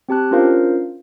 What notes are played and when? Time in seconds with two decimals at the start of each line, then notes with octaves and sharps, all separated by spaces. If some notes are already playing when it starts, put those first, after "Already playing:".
0.09 C4 G4 A5 F#6
0.31 C#4 D4 F4 A#4 C5 F5